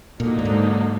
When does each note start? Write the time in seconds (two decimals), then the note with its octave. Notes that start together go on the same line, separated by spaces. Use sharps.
0.19 A#2 D3 F#3 A#3 D#4
0.39 A2
0.45 G#2